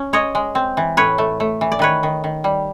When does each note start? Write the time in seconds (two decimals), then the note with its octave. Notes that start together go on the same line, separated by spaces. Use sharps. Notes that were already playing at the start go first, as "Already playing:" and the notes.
Already playing: C#4
0.13 G#3 C#5 D#5
0.35 G#3
0.55 C4
0.77 E3
0.97 A2 B4 C#5
1.18 A3
1.40 A3
1.61 E3
1.72 D5
1.79 D#3 B4 C#5
2.03 D#3
2.24 D#3
2.44 G3